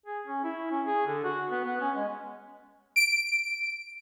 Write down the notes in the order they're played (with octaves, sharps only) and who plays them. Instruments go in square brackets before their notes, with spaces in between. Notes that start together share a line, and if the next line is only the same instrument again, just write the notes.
[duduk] G#4
C#4
E4
C#4
G#4
D3
F#4
B3
B3
C#4
G#3
[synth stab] D7